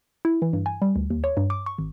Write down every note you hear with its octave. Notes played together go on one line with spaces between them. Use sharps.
E4
E3
G2
G#5
G3
D2
D#2
C#5
G2
D6
C#6
G#1